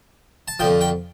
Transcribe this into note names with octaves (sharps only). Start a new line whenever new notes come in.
A5
F2 D3 F3 G5
G5